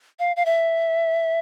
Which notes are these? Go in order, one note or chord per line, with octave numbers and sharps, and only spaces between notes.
F5
F5
E5